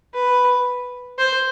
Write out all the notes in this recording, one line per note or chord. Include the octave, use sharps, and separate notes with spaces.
B4
C5